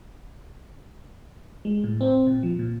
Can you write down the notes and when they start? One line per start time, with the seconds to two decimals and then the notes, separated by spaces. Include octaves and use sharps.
1.65 G#3
1.84 A2
2.01 C4
2.27 A#2
2.43 F3
2.59 A#2